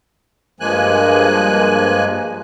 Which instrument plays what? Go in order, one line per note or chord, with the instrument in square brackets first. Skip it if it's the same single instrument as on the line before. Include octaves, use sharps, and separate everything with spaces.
[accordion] G2 F3 G#3 A#3 G#5 F#6